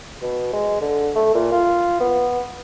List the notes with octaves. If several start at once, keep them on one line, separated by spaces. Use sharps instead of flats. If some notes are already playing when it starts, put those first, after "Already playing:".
B2
G#3
D3
A3
A#2
F4
B3